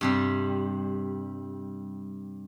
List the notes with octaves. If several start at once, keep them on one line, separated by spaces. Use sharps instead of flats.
G2 C3 G3